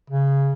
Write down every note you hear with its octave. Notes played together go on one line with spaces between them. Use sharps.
C#3